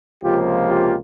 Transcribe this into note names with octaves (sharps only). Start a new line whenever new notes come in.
C#2 C3 F3 A#3 F4 G4
F4 G4